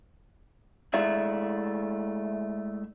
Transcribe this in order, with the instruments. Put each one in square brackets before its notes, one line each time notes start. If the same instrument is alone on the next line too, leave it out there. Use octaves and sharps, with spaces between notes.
[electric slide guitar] G#3 A3 E4 G#4 D5 E5